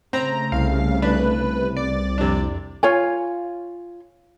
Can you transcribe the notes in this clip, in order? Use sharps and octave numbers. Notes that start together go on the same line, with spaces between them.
C#3 A3 C4 A#5
C2 F5
D4 B4
D5
F2 C3 D4
F4 C#5 G#5